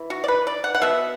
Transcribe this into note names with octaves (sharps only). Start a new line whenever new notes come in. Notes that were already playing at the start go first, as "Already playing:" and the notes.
Already playing: E3
F#4
D5
B4
D5
F#5
F#5
B2 B3 E5